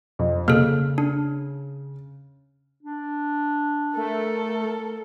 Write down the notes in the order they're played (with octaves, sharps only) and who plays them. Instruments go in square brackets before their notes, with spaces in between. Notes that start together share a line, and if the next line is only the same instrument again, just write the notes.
[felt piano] F2
[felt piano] C#3 F6 [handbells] A#3 A4
[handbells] D4
[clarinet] D4
[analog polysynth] A3 [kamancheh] A4 A#4